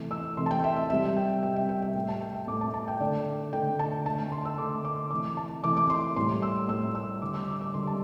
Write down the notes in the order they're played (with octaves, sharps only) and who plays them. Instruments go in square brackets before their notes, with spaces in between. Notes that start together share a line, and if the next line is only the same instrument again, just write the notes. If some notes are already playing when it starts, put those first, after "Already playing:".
Already playing: [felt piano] C3 E3 A3
E6
C3 E3 A3 C6
A5
G5
E5
E5
C3 G3 E5
G5
C3 G3 G5
E5
G5
G5
A2 A3 G4
A5
G5
E5
A2 D6
A3
A5
A5
G5
D3 A3 D5
D3 A3 G5
A5
D3 A3 A5
A5
C6
E6
D3 A3 D6
D6
C3 E3 A3 D6
A5
C3 E3 A3 D6
D6
C6
A2 G3 C6
E6
A2 E6
G3
E6
D3 G3 D6
E6
D6
D6
D3 G3 C6
A5